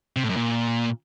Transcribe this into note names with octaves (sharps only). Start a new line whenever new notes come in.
C3
A2
F#2
A#2